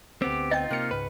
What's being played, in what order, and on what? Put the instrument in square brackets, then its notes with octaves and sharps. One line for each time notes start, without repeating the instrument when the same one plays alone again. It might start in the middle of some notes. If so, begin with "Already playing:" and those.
[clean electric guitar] D2 B3 C4 [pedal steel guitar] G4
[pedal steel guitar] D#4 F4 [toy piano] D#5 [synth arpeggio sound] G5 A6
[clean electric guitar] C3 A#3 [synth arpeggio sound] F6 C#7
[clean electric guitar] C#2 G#2 B4